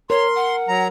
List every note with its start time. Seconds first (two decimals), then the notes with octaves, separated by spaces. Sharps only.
0.10 A#4 C#5 C6
0.35 F#5
0.68 F#3 A#5